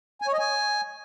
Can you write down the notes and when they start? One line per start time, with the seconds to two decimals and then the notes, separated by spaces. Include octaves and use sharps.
0.22 G#5
0.27 C#5
0.33 D#5
0.39 G#5